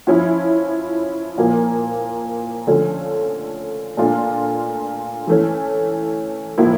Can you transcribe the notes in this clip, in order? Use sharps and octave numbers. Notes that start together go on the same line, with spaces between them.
F3 C#4 E4
A#2 F3 A#3
D3 F3 A3 C#4
A#2 A3 D4 F4
E3 A3 C#4
A2 F3 A#3 E4